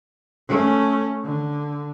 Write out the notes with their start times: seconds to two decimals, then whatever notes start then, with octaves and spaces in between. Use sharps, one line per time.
0.48 A3 C#4
1.24 D3